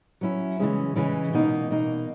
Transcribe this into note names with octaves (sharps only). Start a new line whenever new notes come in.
F#3 C#4 E4
C#3 E3 G#3 C#4
C#3 E3 G#3 C#4
B2 A#3 D#4
B2 A#3 D#4